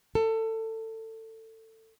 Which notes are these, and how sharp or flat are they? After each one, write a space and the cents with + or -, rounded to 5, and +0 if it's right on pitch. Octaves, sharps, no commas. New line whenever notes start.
A4 +20